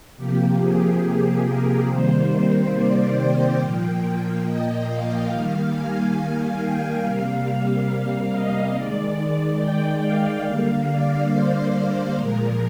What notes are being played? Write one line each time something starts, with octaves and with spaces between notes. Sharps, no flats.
C3 F3 A#3 G4
G#4
G4
A#4
C3 D#3 G3 A#3 C5
D5
G5
A#2 F3 A#3
G5
D#5
F5
D#3 G3 A#3
G#5
G5
C3 G3 A#3 F5
F5
D#5
D#3 G#3 D5
G5
F5
D3 G3 A#3
D5
C5
A#2 F3 G#3 A#4